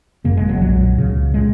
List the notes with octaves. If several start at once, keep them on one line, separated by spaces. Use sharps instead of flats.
G#1 F#2 C#3 A#3
G#3
F#3
B1 A#2 F#3
C#2 C#3
A#2 G#3